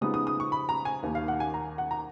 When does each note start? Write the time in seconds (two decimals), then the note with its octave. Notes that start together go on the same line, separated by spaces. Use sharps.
0.01 C#3 F3 G#3 B3 D#4 D#6
0.14 D#6
0.27 D#6
0.40 C#6
0.52 B5
0.69 A#5
0.85 G#5
1.03 D#2 D#3 A#3
1.15 F5
1.28 F#5
1.40 G#5
1.54 A#5
1.78 F#5
1.91 A#5